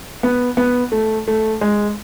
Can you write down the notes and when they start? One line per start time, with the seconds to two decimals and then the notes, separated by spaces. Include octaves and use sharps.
0.23 B3
0.57 B3
0.92 A3
1.28 A3
1.61 G#3